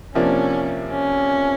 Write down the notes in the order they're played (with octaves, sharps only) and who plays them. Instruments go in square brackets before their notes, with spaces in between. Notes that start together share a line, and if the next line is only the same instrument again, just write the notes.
[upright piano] C3 F3 A#3 D4 [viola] C#4
[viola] C#4